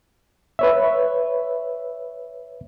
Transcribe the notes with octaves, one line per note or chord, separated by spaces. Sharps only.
B4 C#5 E5